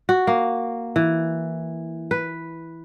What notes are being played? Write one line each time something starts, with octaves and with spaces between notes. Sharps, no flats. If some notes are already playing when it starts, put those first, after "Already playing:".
F#4
A#3
E3
B4